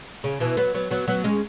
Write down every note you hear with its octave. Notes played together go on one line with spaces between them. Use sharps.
C#3
B2 E3
F#3 B3
F#3 B3
F#3 B3
F#3 B3
G#3 C#4